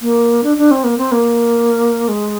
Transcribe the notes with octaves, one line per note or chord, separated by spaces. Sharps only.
A#3
D4
D4
C4
A#3
C4
A#3
G#3